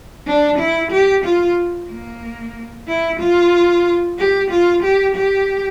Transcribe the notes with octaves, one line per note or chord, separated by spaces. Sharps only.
D4
E4
G4
F4
A#3
E4
F4
G4
F4
G4
G4